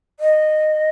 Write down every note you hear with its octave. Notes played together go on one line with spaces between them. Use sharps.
D#5